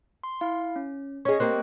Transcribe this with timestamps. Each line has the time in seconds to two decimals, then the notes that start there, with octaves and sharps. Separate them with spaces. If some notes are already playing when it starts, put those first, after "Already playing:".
0.23 C6
0.41 E4 F5
0.76 C#4
1.25 C#4 G#4 D#5 C#6
1.40 G3 A#3 C4 F#6